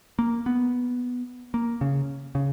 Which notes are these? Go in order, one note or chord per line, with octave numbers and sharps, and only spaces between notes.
A#3
B3
A#3
C#3
C#3